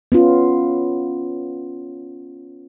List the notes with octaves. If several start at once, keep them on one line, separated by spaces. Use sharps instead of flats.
B3 C#4 F4